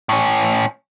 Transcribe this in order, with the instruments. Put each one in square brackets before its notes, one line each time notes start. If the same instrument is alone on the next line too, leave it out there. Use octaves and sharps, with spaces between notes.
[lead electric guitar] A2 C#4